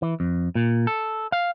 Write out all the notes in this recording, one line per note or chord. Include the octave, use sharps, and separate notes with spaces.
E3
F2
A#2
A4
F5